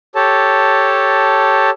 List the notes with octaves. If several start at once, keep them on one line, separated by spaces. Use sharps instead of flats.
G4 A4 C#5 A5